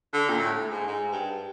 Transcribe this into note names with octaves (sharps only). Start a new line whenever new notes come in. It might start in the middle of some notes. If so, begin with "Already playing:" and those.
D3
A#2
A2
G#2
G#2
G2